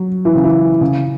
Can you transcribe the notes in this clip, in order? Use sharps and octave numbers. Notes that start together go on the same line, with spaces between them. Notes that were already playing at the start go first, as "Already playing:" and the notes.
Already playing: F#3
E3
C#3
E3
C#3